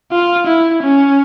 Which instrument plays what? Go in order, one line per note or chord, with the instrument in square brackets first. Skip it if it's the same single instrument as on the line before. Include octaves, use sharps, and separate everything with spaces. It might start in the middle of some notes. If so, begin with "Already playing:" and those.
[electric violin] F4
E4
C#4